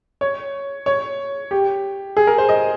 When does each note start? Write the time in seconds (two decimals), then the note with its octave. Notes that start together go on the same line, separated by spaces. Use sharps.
0.21 C#5
0.86 C#5
1.51 G4
2.17 G#4
2.27 A#4
2.38 C5
2.49 D#5